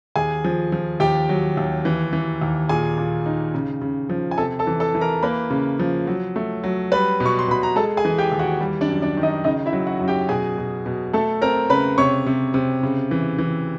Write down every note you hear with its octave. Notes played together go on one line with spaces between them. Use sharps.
D#2 G#4 G#5
F3
F3
D#2 G4 G5
F#3
D#2
E3
E3
D#2
A#2 G#4 G#5
A#2
D#4
C#3
C#3
F3
G#5
C3 A4 A5
A4 A5
E3
A4 A5
E3
A#4 A#5
A#3 B4 B5
C#3
F3
F#3
A3
F#3
G3 B4 B5
B2
C#6
C6
B2 B5
A#5
G#3 A4 A5
G#4 G#5
E3
G4 G5
D#2
F#4 F#5
G3
D4 D5
F#2
D4 D5
D#3
D#4 D#5
C#3 D#4 D#5
E4 E5
F#3
F#4 F#5
F#2
G4 G5
B2 G#4 G#5
B2
B2
A3 A4 A5
C4 A#4 A#5
C#3 B4 B5
C3 C#5 C#6
C3
C3
C#3
E3
E3